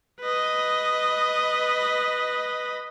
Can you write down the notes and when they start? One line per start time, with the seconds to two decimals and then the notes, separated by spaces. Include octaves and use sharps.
0.21 B4 D#5